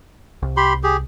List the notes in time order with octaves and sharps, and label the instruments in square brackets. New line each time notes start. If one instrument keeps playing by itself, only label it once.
[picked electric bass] C2
[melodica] G4 B5 C6
G4 G#4